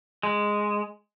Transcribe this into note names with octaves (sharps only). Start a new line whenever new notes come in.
G#3